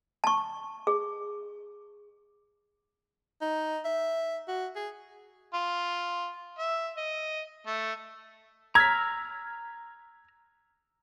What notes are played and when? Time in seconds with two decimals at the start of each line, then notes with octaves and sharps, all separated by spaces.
0.24 A5 C#6
0.87 G#4
3.41 D#4
3.85 E5
4.48 F#4
4.76 G#4
5.54 F4
6.58 E5
6.98 D#5
7.67 A3
8.75 A#5 E6 F6 G#6 B6